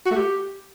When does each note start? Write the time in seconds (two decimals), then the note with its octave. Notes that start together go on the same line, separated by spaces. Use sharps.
0.06 F#4
0.11 A3
0.16 G4